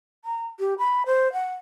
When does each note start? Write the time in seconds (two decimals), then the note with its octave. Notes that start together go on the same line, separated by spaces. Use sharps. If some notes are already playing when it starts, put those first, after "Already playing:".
0.25 A#5
0.60 G4
0.79 B5
1.06 C5
1.33 F#5